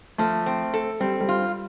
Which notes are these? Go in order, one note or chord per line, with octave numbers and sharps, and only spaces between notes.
F3 A3
C4
A4
G3 C4
G3
F4